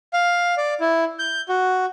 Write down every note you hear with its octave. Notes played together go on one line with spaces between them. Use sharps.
F5
D5
E4
G6
F#4